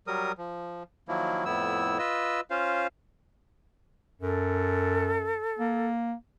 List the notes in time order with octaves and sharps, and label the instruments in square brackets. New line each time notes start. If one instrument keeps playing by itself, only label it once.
[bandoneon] F#3 G3 A#4 D#6
F3
D#3 F3 F#3 A#3 E4
F2 A2 B3 E4 E6
F4 B4 D#5 E6
C#4 F4 C5 F5
[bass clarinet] F#2 [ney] A4
[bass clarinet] A#3